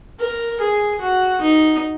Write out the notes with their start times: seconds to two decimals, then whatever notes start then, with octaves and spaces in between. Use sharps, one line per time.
0.19 A#4
0.61 G#4
1.01 F#4
1.42 D#4